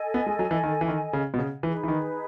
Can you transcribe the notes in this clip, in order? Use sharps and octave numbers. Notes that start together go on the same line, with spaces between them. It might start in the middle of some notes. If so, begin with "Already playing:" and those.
Already playing: A4 D#5 G#5
B3
G#3
F#3
E3
D#3
E3
D#3
C#3
B2
C#3
E3 D#4 G#4 B4
E3
D#3